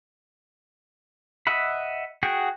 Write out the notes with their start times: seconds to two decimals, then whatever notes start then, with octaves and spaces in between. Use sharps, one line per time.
1.47 D#5 E5 F#5 B5
2.23 F#4 G#4 F#5 G5